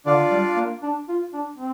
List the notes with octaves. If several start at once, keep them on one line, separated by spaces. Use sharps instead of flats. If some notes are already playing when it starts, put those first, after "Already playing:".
D3 D4 F4 D5 F5
G3
A#3
D4
F4
D4
C4